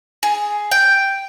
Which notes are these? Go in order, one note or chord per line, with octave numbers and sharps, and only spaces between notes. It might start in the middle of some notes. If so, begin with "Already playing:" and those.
G#4
G5